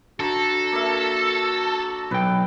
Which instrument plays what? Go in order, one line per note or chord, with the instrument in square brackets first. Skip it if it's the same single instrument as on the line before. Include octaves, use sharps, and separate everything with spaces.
[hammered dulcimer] D3 A#5 [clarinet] F#4 [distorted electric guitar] A4
[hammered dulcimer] A#3 E5
[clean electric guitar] B1 G5 [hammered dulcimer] B4